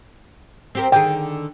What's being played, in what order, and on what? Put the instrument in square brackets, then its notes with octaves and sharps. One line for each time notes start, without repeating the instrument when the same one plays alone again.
[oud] C4 G4 A#4
[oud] D3 D#3 G#4 [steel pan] G5